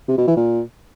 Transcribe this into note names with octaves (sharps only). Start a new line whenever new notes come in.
C3
B2
E3
A#2